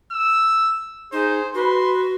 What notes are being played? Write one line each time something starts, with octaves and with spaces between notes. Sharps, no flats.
E6
D#4 G#4 C5
F#4 B4 C6